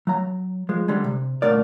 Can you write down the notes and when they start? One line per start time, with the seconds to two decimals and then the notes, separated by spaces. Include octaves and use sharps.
0.07 F#3 A#5
0.69 F3 G#3
0.88 D3 G3 G#3
1.04 C3
1.42 C2 A#2 D3 A3 A#4 D5